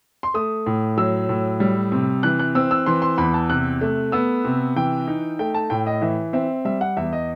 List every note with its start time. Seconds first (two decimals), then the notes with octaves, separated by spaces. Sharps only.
0.23 C6
0.34 A3 D#6
0.66 A2
0.97 F#3 E6
1.29 A2
1.60 G3
1.92 C3
2.23 E3 F#6
2.39 F#6
2.55 C4 E6
2.71 E6
2.86 E3 C6
3.02 C6
3.18 E2 B5
3.34 A5
3.50 C3 F#6
3.81 A3
4.12 B3 E6
4.45 C3
4.76 E3 G5
5.08 D#4
5.39 A3 G5
5.55 A5
5.70 A2 G5
5.87 D#5
6.02 E3 E5
6.33 C4 E5
6.65 G3 E5
6.81 F#5
6.97 E2 E5
7.13 D#5